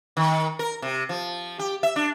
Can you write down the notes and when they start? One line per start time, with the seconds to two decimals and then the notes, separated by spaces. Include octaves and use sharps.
0.17 D#3
0.59 A#4
0.82 C3
1.09 F3
1.59 G4
1.83 E5
1.96 D4